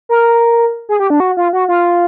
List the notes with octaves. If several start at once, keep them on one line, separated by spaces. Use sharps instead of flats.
A#4
G#4
G4
D4
F#4
F4
F#4
F4